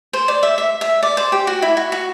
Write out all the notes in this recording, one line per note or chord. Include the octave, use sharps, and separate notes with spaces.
C5
D5
E5
E5
E5
D5
C5
G4
F#4
E4
F#4
F#4